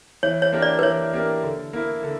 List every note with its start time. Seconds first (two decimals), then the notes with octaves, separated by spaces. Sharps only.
0.23 E3 C#5
0.42 C#5
0.52 A#3 D4 G4 A#4
0.62 D5
0.79 B4
0.82 E3 C#5
1.13 A#3 D4 G4 A#4
1.43 D3
1.73 A#3 E4
2.03 D3